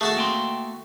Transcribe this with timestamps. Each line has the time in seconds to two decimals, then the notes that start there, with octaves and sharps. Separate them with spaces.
0.01 A3 F#4 G#4 A5
0.17 A#3 G5 C6